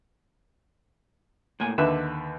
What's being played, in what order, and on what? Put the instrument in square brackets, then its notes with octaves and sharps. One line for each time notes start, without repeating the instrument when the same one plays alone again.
[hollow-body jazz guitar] A2 A#3 G#5
[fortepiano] D#2 D3 B4 [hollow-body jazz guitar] E5